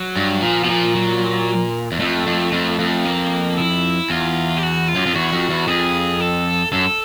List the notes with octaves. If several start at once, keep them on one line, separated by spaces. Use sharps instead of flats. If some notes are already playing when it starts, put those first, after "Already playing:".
Already playing: F#3
G2
A#2 F3
B2
A#2
F#3
E2
F2 A3
F2
F2
F2
A#3
E4
E2 F4
G4
F#4
F4
F#2
F2
E2 F#4
F2
E2
F2 G#4
A4
F#2 A4